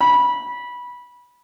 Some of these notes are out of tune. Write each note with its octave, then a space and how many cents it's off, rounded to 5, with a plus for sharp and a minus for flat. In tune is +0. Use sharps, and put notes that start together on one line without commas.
B5 -15